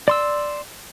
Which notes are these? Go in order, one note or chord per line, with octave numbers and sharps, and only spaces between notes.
D5 C6 E6